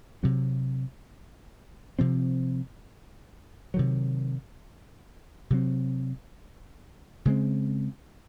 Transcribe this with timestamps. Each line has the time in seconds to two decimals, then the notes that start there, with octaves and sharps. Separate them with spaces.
0.23 C3 F#3 C4
1.99 C3 F3 C4
3.74 C3 D#3 F#3
5.50 C3 F#3 C4
7.25 C#3 G#3 C4